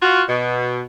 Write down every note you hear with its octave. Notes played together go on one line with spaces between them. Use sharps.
F4 F#4
B2